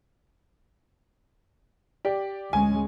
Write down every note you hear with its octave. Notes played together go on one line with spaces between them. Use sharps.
G4 D5
D2 G#3 C#4 G#5